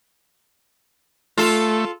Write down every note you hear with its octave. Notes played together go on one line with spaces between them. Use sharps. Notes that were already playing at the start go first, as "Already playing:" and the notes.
A3 F4 A4